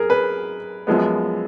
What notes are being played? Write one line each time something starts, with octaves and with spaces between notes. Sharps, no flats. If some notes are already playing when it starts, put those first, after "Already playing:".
Already playing: F#2 G#4 A#4
B4
F#2 F3 G#3 B3